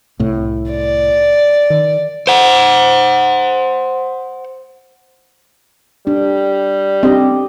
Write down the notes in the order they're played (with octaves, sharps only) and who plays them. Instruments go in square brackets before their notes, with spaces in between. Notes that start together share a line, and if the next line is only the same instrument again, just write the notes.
[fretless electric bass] C2 A2
[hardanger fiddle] D5
[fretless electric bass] D#3
[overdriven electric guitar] C5 F#5
[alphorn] G3 [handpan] D4
[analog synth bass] C4 [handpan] D4 G4 D#5